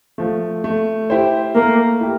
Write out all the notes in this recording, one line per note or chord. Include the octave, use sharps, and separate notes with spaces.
F3 A3
A3
E4 G4 C5
A3 A#3
E4 G4